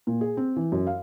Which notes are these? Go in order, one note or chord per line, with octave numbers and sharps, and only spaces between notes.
A#2
G#4
C4
E3
F#2
F5